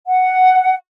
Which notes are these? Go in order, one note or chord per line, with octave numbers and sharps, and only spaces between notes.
F#5